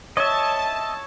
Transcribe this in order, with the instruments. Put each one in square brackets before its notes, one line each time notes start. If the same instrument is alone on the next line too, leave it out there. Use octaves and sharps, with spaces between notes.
[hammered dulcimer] C#5 [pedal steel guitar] D#5 E5 [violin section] A5